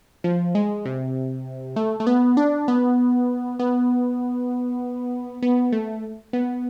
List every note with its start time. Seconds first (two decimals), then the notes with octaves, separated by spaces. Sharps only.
0.24 F3
0.55 G#3
0.85 C3
1.76 A3
2.00 A3
2.07 B3
2.37 D4
2.68 B3
3.59 B3
5.42 B3
5.72 A3
6.33 B3